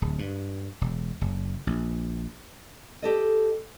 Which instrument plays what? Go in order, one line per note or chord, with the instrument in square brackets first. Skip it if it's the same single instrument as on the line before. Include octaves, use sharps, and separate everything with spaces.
[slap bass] D1
G2
E1
F#1
A#1
[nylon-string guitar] G4 A4 D#5